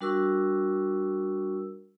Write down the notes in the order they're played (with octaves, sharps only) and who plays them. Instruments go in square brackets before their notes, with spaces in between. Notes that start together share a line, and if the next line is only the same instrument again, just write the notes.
[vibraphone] G3 D4 F#4 A#4 C#6 E6